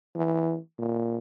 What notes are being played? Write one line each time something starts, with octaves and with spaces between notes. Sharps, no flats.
E3
A#2